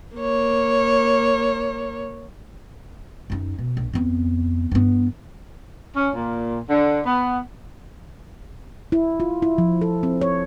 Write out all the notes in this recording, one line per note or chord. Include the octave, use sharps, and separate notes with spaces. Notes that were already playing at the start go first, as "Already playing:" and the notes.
A#3 C#5
F#2 D#4
B2
A#1
F2 B3
G2 B3
C#4
A#2
D3
B3
E4
F4
E4
F3
A4
C4
C#5